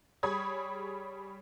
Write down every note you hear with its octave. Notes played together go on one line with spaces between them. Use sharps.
G3 G#4 C#5 B5 D#6 G#6